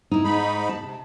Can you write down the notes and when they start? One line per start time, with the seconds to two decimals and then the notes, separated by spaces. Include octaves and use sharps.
0.11 D#4 E4
0.24 G#2 G#3 D#4 B5
0.69 A5
0.83 C3